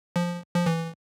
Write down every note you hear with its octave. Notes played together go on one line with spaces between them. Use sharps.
F3
F3
E3